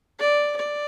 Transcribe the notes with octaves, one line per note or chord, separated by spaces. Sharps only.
D5
D5